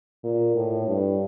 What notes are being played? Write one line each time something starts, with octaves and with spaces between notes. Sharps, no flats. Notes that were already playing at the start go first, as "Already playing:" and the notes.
A#2
A2
G2